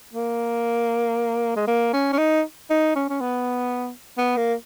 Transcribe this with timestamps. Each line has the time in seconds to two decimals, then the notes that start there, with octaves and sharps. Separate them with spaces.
0.14 A#3
1.56 G#3
1.67 A#3
1.94 C#4
2.13 C#4
2.18 D#4
2.70 D#4
2.96 C#4
3.10 C#4
3.21 B3
4.18 B3
4.37 A#3